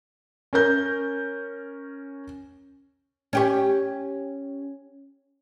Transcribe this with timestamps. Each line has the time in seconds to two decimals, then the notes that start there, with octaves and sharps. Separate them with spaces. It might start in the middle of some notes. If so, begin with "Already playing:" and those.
0.53 C#4 A#4 G6
3.33 C#4 G4 C#5